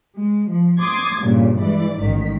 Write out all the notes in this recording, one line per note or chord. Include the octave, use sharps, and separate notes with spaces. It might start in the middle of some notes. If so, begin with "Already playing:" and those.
G#3
F3
C6 D6 D#6 G#6 A6
G2 A#2 C#3
E3 G#3 D5
A1 G#2 D#3 B6